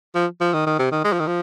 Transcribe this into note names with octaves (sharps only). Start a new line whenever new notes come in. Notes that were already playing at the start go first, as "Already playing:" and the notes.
F3
F3
D#3
D#3
C3
D#3
G#3
F3
D#3
F3